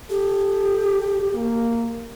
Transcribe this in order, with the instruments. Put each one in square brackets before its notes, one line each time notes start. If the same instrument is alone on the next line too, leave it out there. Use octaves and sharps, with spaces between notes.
[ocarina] G4 [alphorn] A4
[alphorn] A#3